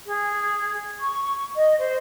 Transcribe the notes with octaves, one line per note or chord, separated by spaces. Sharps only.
G#4
C#6
D#5
C5